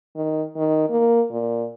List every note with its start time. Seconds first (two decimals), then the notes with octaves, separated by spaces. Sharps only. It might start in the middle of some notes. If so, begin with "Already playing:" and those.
0.16 D#3
0.56 D#3
0.89 A#3
1.31 A#2